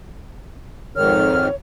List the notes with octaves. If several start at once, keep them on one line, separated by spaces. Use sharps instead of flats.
F2 G#2 D#3 C#5 F6